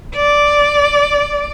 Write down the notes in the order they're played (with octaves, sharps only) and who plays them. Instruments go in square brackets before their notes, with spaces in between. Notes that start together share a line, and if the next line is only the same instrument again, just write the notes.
[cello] D5